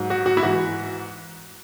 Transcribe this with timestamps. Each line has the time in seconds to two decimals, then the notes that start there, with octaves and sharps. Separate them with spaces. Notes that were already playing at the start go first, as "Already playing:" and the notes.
Already playing: G#2 F#3
0.10 F#4
0.26 F#4
0.37 E4
0.42 G#2 E3 F#4